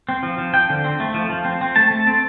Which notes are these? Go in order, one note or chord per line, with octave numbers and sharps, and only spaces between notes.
C4
F3
F3
F3 G5
D3
C4
A3
F3
F3
C4
C4
A3 A5
A3
C4